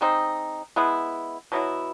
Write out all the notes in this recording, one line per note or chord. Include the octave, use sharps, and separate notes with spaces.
G#3 C4 D#4
G#3 B3 E4
B2 F#3 B3 E4